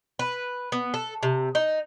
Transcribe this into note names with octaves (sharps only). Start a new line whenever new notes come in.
B4
B3
A4
C3
D#4